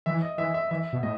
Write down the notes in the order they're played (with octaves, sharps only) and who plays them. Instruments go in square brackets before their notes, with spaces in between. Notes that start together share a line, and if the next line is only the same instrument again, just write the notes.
[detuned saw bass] E3 [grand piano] E5
[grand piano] D#5
[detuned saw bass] E3 [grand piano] E5
[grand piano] E5
[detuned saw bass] E3 [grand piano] E5
[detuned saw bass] B2
[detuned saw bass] A2 [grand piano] D#5